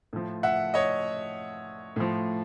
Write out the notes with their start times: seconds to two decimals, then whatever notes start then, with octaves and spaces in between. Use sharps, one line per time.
0.13 A2 F3
0.43 E5 F#5
0.74 C#5 D#5
1.96 A2 F3